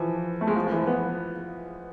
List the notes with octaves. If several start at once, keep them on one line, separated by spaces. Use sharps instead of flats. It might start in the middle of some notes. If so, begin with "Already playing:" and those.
Already playing: E3 F3
A3
G#3
F3
F3
E3
B3